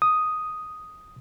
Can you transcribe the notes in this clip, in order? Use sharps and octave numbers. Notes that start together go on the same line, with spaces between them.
D#6